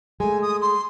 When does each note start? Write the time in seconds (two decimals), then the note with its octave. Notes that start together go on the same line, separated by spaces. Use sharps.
0.20 G#3 A3 G#5
0.42 D#6
0.61 C6